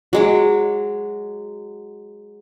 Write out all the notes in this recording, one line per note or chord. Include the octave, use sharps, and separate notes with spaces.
F#3 G#3 D6